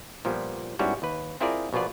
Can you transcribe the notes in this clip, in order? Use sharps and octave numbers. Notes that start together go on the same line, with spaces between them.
A#2 F3 G3 B3
G#2 G3 B3 C#4 E4 F#4
D#2 B4
C4 E4 F4 G#4 A#4 D5
A#1 B2 B3 F4 D5